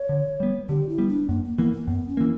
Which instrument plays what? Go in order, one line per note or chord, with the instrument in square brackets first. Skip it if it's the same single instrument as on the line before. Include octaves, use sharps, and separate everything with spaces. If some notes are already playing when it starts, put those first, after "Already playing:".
Already playing: [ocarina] C#5
[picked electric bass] D3
G3 B3
[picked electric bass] D3 [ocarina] G4
[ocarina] E4
[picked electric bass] G3 B3
[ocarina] D4
[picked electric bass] F#2 [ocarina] A#3
[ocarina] A#3
[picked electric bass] E3 A#3 [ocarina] B3
[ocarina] A#3
[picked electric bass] F#2 [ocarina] B3
[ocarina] C#4
[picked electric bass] E3 A#3